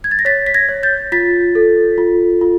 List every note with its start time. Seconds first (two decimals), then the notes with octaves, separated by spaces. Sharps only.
0.04 G#6
0.11 A6
0.19 A#6
0.25 C#5 A6 B6
0.46 B6
0.54 G#6 A#6
0.69 C#5
0.83 G6 A6
1.12 F4 A6 B6
1.55 A4
1.98 F4
2.41 F4